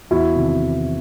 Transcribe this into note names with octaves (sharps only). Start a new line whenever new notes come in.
E2 E4 F#4
C3 D#3